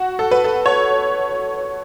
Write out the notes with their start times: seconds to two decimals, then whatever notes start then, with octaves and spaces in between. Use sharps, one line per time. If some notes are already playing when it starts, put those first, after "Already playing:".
Already playing: F#4
0.19 A4
0.31 B4
0.44 A4
0.66 C#5